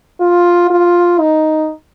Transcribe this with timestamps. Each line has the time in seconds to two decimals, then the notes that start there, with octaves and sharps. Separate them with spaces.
0.20 F4
0.70 F4
1.20 D#4